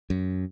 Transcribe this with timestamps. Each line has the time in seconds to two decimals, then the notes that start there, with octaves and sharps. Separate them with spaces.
0.10 F#2